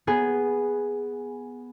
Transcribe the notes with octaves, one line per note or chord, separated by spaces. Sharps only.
B3 G#4